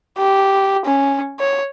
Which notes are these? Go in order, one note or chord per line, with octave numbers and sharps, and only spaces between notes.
G4
C#4
C#5